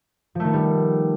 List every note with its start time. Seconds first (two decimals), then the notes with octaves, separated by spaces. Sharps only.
0.35 F3
0.40 A3
0.44 D#3
0.49 B3
0.53 G3